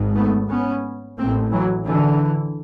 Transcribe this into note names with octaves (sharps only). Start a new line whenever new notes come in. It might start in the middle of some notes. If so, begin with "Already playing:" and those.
Already playing: G#1 G#2
A3 B3
B3 C#4
A1 A2 A#3 C4
E3 F#3
D3 E3